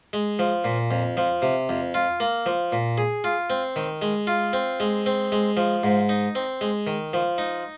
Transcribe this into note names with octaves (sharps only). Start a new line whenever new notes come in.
G#3
F3
A#2
F2
F3
C3
F2
F4
A#3
F3
A#2
G#4
F4
C4
D#3
G#3
F4
C4
G#3
C4
G#3
F3
G#2
D#4
C4
G#3
D#3
F3
D#4